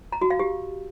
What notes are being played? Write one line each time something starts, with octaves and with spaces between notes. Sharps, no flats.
A#5
F#4
F5
G4